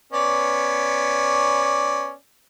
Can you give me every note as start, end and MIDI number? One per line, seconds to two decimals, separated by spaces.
0.13 2.12 59
0.13 2.12 61
0.13 2.12 74